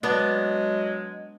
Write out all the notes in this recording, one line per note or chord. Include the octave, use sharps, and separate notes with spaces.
F#3 G#3 B3 D4